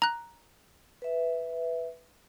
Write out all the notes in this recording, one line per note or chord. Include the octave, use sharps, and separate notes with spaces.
A#5 F#6
B4 E5